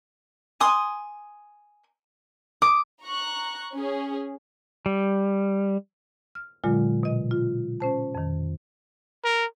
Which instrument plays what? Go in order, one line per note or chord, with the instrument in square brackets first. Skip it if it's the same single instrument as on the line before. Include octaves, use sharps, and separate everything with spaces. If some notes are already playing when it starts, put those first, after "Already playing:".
[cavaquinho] G#5 C6 D#6
[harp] D6 [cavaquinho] D#6
[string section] A#5 C#6 F#6
C#4 G#4
[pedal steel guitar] G3
[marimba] F6
A#2 D3 F#3 G#3 F4
B2 D#5
F4
C#4 C5 A5
F2 D#3
[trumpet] A#4